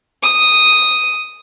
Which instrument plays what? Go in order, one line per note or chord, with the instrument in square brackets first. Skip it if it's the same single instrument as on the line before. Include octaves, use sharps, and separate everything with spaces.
[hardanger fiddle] D#6